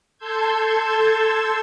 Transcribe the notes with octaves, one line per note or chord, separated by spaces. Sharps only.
A4 A5 C6 E6 G6 G#6